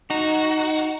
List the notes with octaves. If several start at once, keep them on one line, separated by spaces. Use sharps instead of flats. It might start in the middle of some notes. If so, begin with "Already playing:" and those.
D#4 F#4